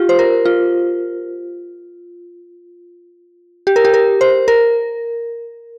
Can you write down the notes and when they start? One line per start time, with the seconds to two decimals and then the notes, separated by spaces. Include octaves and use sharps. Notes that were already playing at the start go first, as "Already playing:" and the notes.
Already playing: F4 G4
0.09 C5
0.19 A#4
0.45 F4
3.67 G4
3.76 A#4
3.85 G4
3.94 A#4
4.21 C5
4.48 A#4